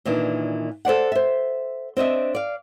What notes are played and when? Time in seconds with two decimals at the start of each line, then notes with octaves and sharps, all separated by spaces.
0.05 A#2 D#3 E3 D4
0.85 A4 C5 D5 F#5
1.12 C5 E5
1.97 C4 D4 D#5 E5
2.35 D5 F5